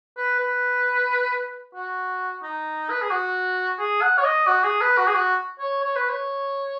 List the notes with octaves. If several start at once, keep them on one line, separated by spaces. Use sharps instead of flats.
B4
B4
F#4
D#4
B4
G#4
F#4
G#4
F#5
C#5
D#5
F#4
G#4
B4
F#4
G#4
F#4
C#5
C#5
B4
C#5